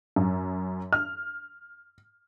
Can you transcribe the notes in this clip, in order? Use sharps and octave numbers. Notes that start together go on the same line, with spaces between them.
F#2
F6